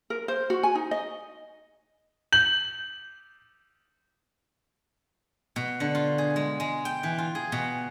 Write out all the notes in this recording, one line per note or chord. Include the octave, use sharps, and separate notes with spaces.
A#4
C5
F#4
G#5
D#4
D#5
G6 F#7
B2
D3
F4
G#4
G#3
G#3
G5
E3
F4
G#4
B2